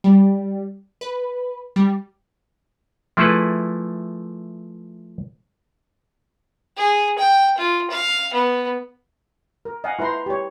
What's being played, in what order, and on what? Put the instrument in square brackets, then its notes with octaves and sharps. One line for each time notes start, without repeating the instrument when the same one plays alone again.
[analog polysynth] G3
B4
G3
[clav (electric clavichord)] F3 A3 E4 G#4 A4 B4
[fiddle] G#4
G5
F4
F5
B3
[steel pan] A#4
D#5 F5 F#5 G#5
E4 B4 C5 A#5 C6
G4 C#5